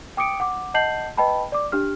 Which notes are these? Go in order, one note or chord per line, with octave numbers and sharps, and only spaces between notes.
G5 D6 D#6 C#7 D7
F#5 D6
D#5 F#5 A5 G6 C7 F#7
B4 D#5 G5 A5 B5
D5 D6
D4 G4 F6